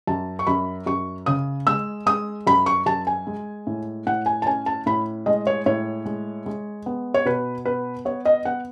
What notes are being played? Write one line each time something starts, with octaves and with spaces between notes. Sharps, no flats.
F#2 A5
C#6
F#2 B5
F#2 C#6
C#3 D#6
G#3 E6
G#3 D#6
F#2 B5
C#6
F#2 A5
G#5
G#3
A2
A2 F#5
G#5
A5
C#4 G#5
A5
A2 B5
G#3 D#5
C#5
A2 C#5
G#3
G#3
B3
C#5
B2 B4
B3 B4
B3 C#5
D#5
B3 F#5